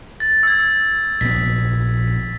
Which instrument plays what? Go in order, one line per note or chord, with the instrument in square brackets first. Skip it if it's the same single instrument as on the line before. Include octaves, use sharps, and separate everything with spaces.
[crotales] A6
E6 G#6
[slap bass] A#1 B3 [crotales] B6